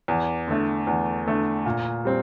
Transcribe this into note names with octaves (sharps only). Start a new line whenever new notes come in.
E2
D3 A3
E2
D3 A3
A#2
G3 C4